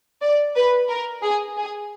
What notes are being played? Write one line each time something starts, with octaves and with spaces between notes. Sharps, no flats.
D5
B4
A#4
G#4
G#4